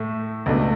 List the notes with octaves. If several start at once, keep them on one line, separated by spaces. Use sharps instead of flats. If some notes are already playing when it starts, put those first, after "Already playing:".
Already playing: A2 A3
C#2 B2 A3 D4